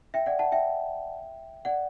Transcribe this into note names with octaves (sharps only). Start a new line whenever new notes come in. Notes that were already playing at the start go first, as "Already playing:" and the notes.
E5 G5
D5 F#5
F#5 A5
E5 G5
D5 F#5